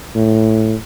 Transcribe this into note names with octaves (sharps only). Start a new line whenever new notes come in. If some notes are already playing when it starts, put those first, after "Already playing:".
A2